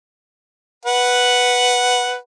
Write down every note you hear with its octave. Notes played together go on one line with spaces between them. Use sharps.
B4 F#5